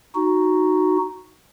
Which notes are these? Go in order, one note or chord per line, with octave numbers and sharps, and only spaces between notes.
D#4 F#4